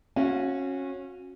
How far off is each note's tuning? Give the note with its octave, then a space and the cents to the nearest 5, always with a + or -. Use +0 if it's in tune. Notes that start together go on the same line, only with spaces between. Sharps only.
C#4 -20 F#4 -25 F5 +0